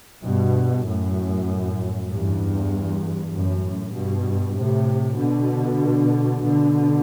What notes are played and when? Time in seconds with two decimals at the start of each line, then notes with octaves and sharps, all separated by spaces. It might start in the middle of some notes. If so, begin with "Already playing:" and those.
0.23 G2 B2
0.86 F#2 A2
2.10 E2 G2
3.33 F#2 A2
3.95 G2 B2
4.58 A2 C3
5.19 B2 D3
6.43 B2 D3